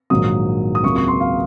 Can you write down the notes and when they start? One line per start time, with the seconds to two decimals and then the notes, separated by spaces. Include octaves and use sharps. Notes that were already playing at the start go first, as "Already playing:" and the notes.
0.10 A#1 G#2 D#3 F#3 D#6
0.75 D#6
0.83 C#2 C3 F#3 A#3 C#6
0.96 C#6
1.08 C6
1.20 F5